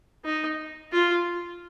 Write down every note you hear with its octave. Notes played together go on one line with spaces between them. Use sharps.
D#4
F4